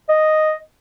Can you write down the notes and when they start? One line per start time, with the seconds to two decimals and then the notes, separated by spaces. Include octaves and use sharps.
0.09 D#5